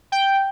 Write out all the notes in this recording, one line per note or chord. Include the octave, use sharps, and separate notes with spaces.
G5